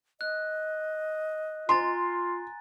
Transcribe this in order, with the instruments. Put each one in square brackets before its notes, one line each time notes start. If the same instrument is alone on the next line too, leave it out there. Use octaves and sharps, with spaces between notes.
[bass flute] D#5 [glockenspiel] F#6
[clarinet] F4 [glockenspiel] G#5 A#5 A6 [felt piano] C6